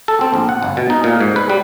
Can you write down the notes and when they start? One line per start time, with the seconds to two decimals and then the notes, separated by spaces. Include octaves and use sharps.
0.08 A4
0.21 C4
0.34 A#1
0.49 F#5
0.63 G1
0.77 B2
0.90 D#4
1.04 A#2
1.21 G#2
1.36 B4
1.50 G3